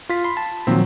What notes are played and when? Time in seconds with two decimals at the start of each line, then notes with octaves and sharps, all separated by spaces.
0.09 F4 B6
0.24 B5 C6
0.37 A5
0.67 A#2 D#3 F3 F#3 C4